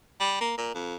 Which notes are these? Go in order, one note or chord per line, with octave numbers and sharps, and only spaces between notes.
G3
A#3
A#2
F2